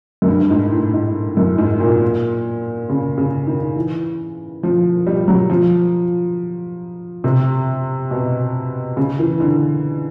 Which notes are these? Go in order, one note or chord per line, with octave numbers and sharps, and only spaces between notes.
F#2
G2
G2
G#2
A2
G#2
F#2
G#2
A#2
C#3
C#3
D#3
E3
F3
G3
F#3
F3
C3
B2
C#3
E3
D3